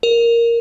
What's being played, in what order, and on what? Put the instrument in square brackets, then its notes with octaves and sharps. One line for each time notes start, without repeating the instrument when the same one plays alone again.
[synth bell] A#4